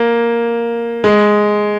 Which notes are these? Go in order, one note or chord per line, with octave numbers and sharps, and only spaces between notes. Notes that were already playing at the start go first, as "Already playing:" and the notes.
Already playing: A#3
G#3